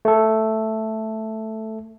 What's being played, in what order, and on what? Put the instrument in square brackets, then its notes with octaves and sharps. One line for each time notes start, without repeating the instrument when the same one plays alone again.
[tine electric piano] A3 A4